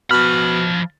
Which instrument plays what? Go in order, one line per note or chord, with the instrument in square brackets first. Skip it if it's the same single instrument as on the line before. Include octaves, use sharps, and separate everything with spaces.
[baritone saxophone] B2 [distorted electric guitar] F3 B5 [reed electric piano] F6